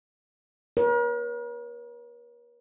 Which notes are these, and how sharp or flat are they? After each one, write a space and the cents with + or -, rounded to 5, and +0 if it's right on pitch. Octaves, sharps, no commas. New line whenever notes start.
A#4 +45 C#5 +0